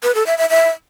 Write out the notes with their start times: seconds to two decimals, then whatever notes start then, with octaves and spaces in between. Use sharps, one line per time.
0.03 B4
0.15 A4
0.26 E5
0.38 E5
0.50 E5